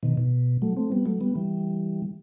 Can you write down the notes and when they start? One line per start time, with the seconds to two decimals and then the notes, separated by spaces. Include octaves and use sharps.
0.03 B2 D#3
0.17 B2
0.62 F#3 A3
0.77 A3 C4
0.92 G3 B3
1.06 F#3 A3
1.21 G3 B3
1.35 E3 G3